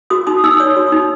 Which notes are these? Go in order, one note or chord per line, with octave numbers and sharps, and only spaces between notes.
F#4 D#6
D#4 D#6
D#4 E6
C#5 D#6
F#4
D#4